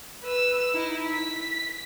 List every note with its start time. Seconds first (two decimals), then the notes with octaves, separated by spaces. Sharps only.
0.23 B4 E6
0.74 D#4 E4
1.07 B6